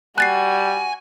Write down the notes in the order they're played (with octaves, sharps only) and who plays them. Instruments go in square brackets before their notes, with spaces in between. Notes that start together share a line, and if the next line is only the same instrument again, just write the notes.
[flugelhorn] G3 [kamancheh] F#4 [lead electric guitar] G#5 [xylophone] F#6 A6 C7